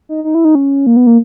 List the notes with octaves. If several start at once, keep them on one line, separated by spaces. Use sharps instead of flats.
D#4
D#4
E4
D#4
C#4
A#3
B3
A#3